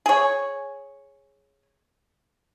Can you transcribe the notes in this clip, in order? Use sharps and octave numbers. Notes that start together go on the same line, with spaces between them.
G#4 C#5